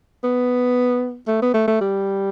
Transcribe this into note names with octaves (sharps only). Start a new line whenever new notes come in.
B3
A3
B3
A3
A3
G3